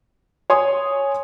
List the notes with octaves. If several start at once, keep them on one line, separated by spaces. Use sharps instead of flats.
C#5 G#5 C6 D#6